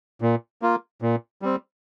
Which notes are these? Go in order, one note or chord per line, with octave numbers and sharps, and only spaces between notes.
A#2
A#3 F4
A#2
G3 C4